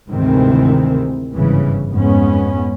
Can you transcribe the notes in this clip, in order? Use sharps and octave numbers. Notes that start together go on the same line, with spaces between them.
D2 G#2 C3 D#3 E3 C4
G1 G#2 C#3 E3
F2 G#2 G#3 B3 C#4